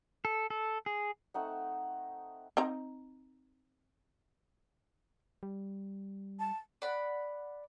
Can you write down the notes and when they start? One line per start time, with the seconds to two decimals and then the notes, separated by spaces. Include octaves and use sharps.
0.25 A4
0.50 A4
0.86 G#4
1.34 A3 C4 D#4 F#5
2.57 C4 D#4 A#5
5.43 G3
6.40 A5
6.82 D5 F#5 B5